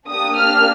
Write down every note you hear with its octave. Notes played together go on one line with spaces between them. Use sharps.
A#3 D4 G4 D#6
F6